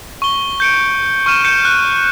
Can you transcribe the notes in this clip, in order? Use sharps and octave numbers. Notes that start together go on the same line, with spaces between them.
C#6 G7
G6 C#7 D7
C#6 F6 D#7 E7
G6 C#7 E7
F#6